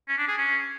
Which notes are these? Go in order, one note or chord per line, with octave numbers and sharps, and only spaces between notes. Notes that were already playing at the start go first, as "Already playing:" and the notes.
C#4
D4
G#4
C#4